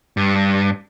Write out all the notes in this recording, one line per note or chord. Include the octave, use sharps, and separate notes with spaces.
G2